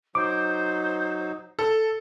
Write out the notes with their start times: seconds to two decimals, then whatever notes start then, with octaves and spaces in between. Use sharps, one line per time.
0.15 F#3 D#4 C5 D6
1.59 A4